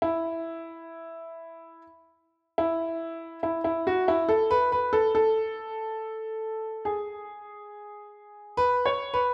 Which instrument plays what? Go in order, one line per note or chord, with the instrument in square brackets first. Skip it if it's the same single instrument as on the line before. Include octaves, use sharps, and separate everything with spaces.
[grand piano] E4
E4
E4
E4
F#4
E4
A4
B4
B4
A4
A4
G#4
B4
C#5
B4